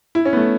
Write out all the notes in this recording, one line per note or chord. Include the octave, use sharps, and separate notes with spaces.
E4
C#4
B3
A3